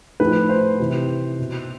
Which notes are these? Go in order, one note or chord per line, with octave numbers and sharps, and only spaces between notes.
A2 F3 B4
C5
C3 E3
B2